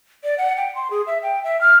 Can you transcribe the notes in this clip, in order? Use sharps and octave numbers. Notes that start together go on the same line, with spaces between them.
D5
F#5
G5
C6
G#4
E5
G5
E5
F6